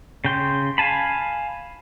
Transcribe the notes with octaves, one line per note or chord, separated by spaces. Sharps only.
C#3 G5 C6
F5 G#5 A5 B5